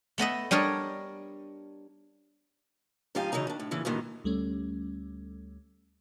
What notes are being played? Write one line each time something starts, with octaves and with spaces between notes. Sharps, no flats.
A3 B3 D#5 E5
G3 D4 A#4 C#5 D#5
G#2 F3 D#4 G4 F5 G#5
C#3 E3 F#3 D#4 A#5
D#3 D4
A2
A#2 C#3 E3
D2 G2 A#2 D#3 E3
D2 G3 A3 C#4